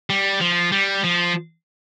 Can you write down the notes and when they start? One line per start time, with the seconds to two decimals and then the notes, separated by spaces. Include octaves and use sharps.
0.10 G3
0.41 F3
0.72 G3
1.04 F3